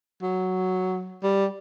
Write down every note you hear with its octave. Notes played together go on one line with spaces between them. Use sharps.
F#3
G3